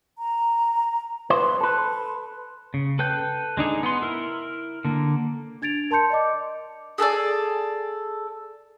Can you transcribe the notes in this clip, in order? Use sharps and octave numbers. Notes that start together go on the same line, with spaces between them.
A#5
B4 C5
A4 B4 C6
C#3
A4 B4 G5 G6
G#3 D4 D#4 G#4
B3 C6
E4 A#4
D3 A#3
D4 G#6 A6 D7 F7
A#4 A5 C6 G6 C#7
D5 D#5 D6
G#4 A4 B4 D5